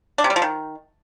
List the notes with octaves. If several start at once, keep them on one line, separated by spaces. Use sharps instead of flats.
D4
C3
G3
F3
D#3